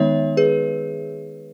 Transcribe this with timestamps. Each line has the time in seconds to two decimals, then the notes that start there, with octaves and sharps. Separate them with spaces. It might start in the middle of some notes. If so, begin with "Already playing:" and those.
Already playing: D#3 G#3 B3 D#4 C#5 E5
0.37 G#4 B4